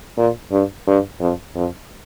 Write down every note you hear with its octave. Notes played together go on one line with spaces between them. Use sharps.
A#2
G2
G2
F2
F2